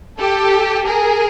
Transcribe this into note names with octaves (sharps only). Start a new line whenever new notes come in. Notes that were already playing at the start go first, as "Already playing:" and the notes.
G4 A4
G#4 A#4